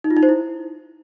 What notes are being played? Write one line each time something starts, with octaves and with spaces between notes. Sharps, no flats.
D#4
F4
D#4
C5
E4